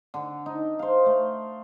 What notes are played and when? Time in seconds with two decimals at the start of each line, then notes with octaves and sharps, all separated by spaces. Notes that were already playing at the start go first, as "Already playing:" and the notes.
0.14 D3
0.46 D#4
0.79 C5 F5
1.06 A3